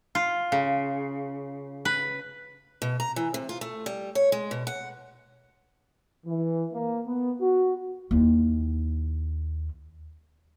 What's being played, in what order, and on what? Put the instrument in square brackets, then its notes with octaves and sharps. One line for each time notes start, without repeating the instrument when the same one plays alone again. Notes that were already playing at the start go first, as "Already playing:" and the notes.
[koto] F4
C#3
B4
[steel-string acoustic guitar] B2
A#5
E3
C3
F4
A3
G3
C#5
G#3
B2
F#5
[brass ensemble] E3
A#3
B3
F#4
[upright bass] D#2 E4